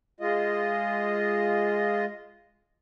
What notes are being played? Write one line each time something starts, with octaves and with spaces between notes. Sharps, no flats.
G#3 F4 D#5